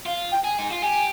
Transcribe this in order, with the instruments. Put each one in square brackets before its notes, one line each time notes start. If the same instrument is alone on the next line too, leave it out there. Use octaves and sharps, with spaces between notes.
[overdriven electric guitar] F4 [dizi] F5
[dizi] G5
[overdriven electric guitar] G#4
[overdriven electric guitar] D#4 [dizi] G#5
[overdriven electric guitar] F4
[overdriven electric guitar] G4 [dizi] G#5